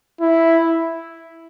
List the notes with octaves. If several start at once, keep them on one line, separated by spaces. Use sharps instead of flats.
E4